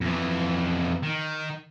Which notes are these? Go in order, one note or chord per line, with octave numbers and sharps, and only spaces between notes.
F2 E3
D#3